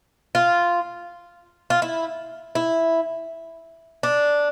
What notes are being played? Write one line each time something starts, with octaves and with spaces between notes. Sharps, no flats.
F4
F4
E4
E4
D4